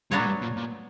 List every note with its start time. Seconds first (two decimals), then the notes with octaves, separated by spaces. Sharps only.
0.11 G2 F#3 B3 D4 F#4 C#5
0.19 A#2
0.26 G2
0.42 A#2
0.57 A#2